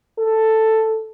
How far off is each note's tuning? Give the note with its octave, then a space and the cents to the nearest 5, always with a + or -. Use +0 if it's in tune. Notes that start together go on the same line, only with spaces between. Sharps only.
A4 +5